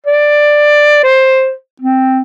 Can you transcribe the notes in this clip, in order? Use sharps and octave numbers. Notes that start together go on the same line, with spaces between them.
D5
C5
C4